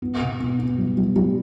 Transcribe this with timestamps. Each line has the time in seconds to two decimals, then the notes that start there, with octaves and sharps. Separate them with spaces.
0.02 B3
0.21 B2
0.40 B3
0.59 B3
0.78 G3
0.97 G3
1.16 G3